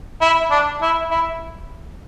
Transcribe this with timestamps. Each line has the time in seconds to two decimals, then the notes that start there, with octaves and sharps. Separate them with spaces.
0.21 E4
0.51 D4
0.81 E4
1.11 E4